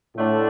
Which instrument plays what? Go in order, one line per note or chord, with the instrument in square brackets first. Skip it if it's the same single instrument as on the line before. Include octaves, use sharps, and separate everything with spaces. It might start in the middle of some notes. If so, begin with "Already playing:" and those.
[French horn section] A2 [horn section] D3 A3 D4 A4